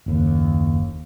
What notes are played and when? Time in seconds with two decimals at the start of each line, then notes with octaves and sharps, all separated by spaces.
0.06 F#1 D#2